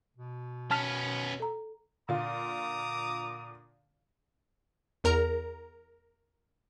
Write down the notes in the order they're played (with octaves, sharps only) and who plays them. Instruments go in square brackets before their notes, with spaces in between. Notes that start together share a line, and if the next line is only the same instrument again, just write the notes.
[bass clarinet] B2
[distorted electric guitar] B3 C#4 [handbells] A5 F6 B6
[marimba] A4 A#5
[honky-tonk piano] A#2 D3 F4 [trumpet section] A#5 D6 D#6
[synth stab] E2 A#4 A#5